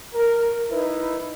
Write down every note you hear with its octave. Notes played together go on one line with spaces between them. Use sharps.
A#4
D#4 E4 B4